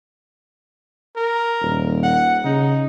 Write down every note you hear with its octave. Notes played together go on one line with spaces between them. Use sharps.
A#4
D#1
F#5
C#3 D#4